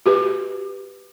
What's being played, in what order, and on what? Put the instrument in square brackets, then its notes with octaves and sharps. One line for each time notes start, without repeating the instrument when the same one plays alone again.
[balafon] F#4 G4 B4